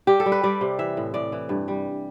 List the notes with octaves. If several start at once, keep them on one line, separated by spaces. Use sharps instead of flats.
G3 G4
A4
G3
B4
G3 D5
C3
E3 E5
A2
A2 D5
E3
G2
G3